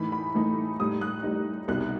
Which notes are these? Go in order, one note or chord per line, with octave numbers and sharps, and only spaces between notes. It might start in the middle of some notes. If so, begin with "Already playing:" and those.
Already playing: A2 E3 A3 D#4 B5
B5
A2 E3 A3 D#4
A2 G3 D#4 D#6
F#6
A2 G3 D#4
C2 B2 G3 D#4 F#6